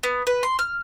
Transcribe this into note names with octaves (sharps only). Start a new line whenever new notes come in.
B3
B4
C6
F6